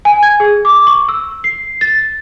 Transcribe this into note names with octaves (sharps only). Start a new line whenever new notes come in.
G#5
G#6
G#4
D6
C#6
E6
C7
A6